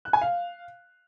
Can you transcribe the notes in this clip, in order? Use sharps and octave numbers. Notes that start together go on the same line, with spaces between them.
F#6
G#5
F5